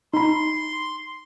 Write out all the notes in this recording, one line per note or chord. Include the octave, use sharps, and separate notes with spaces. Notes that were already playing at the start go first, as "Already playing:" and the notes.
D#4 B5 C6